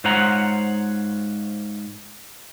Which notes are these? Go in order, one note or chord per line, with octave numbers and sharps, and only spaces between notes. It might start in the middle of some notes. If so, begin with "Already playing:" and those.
G#2 F4 C5 C#5 F#5 A#5